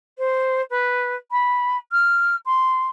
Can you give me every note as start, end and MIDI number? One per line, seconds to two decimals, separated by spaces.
0.18 0.61 72
0.70 1.15 71
1.31 1.76 83
1.92 2.36 89
2.45 2.87 84